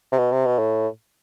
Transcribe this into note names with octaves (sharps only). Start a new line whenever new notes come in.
C3
B2
C3
B2
A2